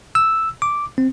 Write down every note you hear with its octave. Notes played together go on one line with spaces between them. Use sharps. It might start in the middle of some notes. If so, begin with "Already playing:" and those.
E6
D6
C4